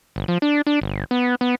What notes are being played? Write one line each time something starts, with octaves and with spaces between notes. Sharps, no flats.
G1
F3
D4
D4
G1
B3
B3